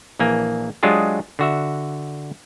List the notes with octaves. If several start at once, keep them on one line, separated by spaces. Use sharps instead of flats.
A#1 E3 A#3 G#5
F#3 G#3 D4 F4 G4 G#4
D3 F#4 E5